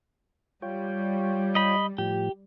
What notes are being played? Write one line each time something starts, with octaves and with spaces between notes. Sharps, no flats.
G3 F4 C#5 G5
D#5 B5
A2 F3 G4